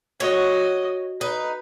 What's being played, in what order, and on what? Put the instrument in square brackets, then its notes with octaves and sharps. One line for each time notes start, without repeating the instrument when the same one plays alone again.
[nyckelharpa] F#4 D#5 [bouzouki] C#5
[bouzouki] D#4 [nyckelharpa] B4